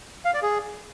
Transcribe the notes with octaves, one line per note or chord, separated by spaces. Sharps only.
F5
D5
G#4